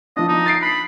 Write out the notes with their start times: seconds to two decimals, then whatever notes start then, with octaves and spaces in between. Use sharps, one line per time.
0.17 F3 D4 D#5
0.28 D#4
0.46 A6 C7 D7
0.62 B5